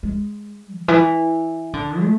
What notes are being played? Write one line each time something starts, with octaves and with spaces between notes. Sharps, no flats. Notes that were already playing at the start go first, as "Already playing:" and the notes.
G#3
D3
E3
D3
A3